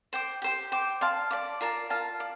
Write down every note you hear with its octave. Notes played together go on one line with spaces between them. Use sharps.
C5 G5 D6
G4 C5 G5
C5 G5 D6
D5 F5 A5 C6
D5 A5 D6
F4 A#4 D5 A5
F4 A#4 F5 A5
D5